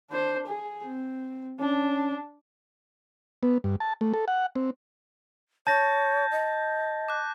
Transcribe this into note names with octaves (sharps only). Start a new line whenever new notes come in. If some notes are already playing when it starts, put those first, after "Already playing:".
D4 C5
G#4
C4
C#4 D4
B3
G2
A5
A3
A4
F#5
C4
C#5 A5 G6 A6 A#6
D#5
D6 F#6